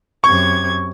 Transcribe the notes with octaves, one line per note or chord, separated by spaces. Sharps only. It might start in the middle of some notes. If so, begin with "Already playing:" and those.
F#2 C3 C#6 G#6